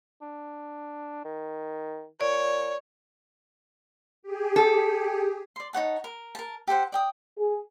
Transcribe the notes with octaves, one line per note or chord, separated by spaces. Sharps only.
D4
D#3
A#2 C#5 D5
G4 G#4
A4
D5 C6
D#4 C#5 F#5 A5
A#4
A#4 A5
G4 A4 C5 F#5
D5 G5 D#6
G#4